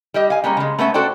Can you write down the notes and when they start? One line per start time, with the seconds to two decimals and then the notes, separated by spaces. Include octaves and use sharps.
0.14 G3 G4 D#5
0.30 F5 G#5
0.44 G3 G#3 A#3 C#4
0.57 C#3 G#3
0.79 A3 B3 C#4 E5
0.94 F#4 A4 C5 D5 G5